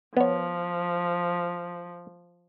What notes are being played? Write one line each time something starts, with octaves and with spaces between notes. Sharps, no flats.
F3 B3 C#5